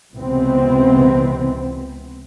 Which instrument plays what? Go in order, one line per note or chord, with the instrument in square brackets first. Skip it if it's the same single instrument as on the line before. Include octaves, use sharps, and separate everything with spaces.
[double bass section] C#2 C3 E3 B3 C4